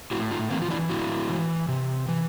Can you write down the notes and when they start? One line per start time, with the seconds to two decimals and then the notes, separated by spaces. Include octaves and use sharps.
0.11 A2 E4 F#4
0.31 D#4 F4
0.50 E3 A#3 C4
0.62 F4
0.70 D4 E4
0.90 A2 E4 F#4
1.29 E3
1.68 C3
2.08 E3